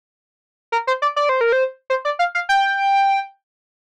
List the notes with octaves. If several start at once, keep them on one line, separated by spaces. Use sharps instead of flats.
A#4
C5
D5
D5
C5
A#4
C5
C5
D5
F5
F5
G5